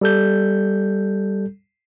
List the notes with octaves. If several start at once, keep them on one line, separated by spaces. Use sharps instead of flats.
G3 A4 G6